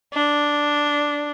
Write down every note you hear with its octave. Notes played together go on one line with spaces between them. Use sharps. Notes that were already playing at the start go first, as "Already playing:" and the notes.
D4